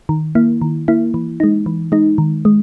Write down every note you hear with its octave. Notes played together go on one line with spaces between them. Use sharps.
D#3
A#3 E4
D#3
A#3 E4
E3
G#3 D#4
E3
G#3 D#4
D#3
G#3